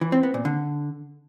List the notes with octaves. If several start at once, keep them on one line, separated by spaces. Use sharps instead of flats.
E3
C4
B3
A#2
D3